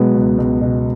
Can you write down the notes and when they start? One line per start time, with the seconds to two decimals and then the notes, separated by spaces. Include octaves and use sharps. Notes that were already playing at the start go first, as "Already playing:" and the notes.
Already playing: B2 F#3 G#3 B3
0.15 C#2
0.38 C#2
0.61 B2